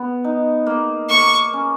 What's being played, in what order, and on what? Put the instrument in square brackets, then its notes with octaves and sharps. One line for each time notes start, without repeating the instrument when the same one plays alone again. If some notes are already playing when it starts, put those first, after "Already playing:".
Already playing: [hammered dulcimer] B3
D#4
A#3
[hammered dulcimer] A#3 [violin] C#6
[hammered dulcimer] C#4